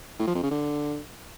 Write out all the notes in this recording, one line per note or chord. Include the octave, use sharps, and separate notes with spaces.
A2
F3
F2
C#3
D3